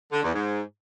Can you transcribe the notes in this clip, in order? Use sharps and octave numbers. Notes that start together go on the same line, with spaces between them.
D3
E2
G#2